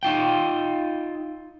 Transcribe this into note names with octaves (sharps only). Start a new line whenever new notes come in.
D#4 F4 G5